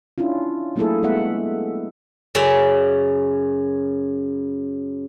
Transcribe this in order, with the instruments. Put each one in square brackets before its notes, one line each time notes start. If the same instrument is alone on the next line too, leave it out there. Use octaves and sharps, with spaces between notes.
[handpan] C#4 D4 E4 F4
F#3 A3 A#3 E4 G#4 A4
G#3 A3 B3 E5 F#5
[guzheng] F#2 C#3 D5 E5